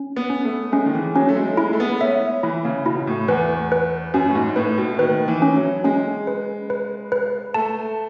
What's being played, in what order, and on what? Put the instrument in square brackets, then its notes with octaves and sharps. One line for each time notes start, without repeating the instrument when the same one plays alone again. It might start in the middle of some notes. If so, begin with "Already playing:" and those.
Already playing: [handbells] C#4
[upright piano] B3
[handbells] C#4
[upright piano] A3
[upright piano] G#3 [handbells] C#4
[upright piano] D#3
E3
[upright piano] F#3 [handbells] C#4
[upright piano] A3
G#3
[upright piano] G#3 [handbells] E4
[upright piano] A3
B3
[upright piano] C#4 [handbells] E5
[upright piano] E3 [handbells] E4
[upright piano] C#3
[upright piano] B2 [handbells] E4
[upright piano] A2
[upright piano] E2 [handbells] B4
[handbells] B4
[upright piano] F#2 [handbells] C#4
[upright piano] A2
G#2
[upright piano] A2 [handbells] B4
[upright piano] B2
[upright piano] D#3 [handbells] B4
[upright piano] E3
[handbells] C#4
[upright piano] F#3
[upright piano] G#3 [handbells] C#4
[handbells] B4
B4
B4
[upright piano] A3 [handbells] A5